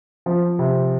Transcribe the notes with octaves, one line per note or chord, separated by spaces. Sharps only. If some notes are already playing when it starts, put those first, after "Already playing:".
F3
C3